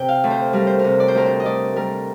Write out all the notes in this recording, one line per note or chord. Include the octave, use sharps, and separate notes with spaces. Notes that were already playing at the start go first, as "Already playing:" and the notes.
Already playing: C3 G5
F5
D2
C5
G3 A#4
C5
C3 A#4
D5
C5
D2 A#4
C5
D#5
D2 D5
G3 A#4